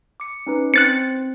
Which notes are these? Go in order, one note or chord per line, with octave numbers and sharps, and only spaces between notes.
D6 C#7
C#4 D#4 B4
C4 C5 F#6 A6 C#7